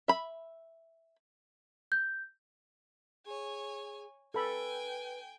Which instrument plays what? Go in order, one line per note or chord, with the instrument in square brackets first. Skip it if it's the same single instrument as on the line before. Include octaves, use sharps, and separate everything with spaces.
[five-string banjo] E5 B5
[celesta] G6
[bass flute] G#4 [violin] C#5 G#5
[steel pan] A4 B5 [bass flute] B4 [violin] G5 G#5